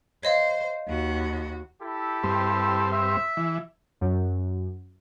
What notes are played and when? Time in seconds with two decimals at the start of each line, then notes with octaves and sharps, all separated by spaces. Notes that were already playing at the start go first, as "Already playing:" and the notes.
0.23 C5 C#5 D#5 F5
0.87 D#2 F#4
1.82 E4 G4 A4
2.23 G2 C4
2.92 E5
3.37 E3
4.01 F#2